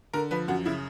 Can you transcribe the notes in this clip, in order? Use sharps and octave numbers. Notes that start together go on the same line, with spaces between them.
D3 A#4
F3 B4
F#2 F#4
C#3 E4